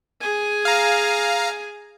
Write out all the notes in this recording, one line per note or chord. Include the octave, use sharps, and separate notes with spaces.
G#4 G#5
F5 A#5